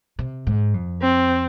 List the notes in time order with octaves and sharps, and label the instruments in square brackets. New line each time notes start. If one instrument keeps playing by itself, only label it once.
[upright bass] C3
G#2
F2
[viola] C4